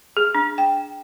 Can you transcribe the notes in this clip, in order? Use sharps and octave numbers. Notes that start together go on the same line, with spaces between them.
G#4
D4
G5